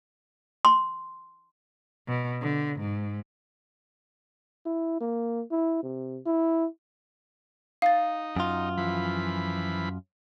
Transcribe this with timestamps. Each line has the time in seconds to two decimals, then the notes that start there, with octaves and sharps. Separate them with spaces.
0.65 C6
2.08 B2
2.42 D3
2.80 G#2
4.66 E4
5.01 A#3
5.51 E4
5.83 C3
6.26 E4
7.82 D#4 F5 A6
8.37 F#2 F4
8.78 E3 F3 B5